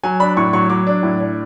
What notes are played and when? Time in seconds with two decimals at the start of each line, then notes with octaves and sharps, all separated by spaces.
0.03 F#3 G#5
0.20 D4 B5
0.37 A2 C#6
0.53 F#3 C#6
0.70 F#3 D6
0.87 D4
1.03 A2
1.20 D4